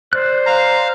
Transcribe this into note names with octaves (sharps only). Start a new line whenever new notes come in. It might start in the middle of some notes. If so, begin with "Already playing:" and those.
C5 D5 F#6
F5 A#5